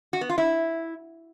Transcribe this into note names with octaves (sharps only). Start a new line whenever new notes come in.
F#4
B3
F4
E4